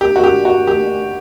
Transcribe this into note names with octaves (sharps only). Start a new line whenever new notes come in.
G4
F#4
G4
F#4
G4